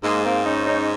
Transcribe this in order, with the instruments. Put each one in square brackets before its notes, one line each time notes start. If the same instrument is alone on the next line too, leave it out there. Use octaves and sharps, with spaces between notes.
[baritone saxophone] G#2 [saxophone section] G#3 A#3
[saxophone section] A#3 C4
C#4 D#4
C#4 D#4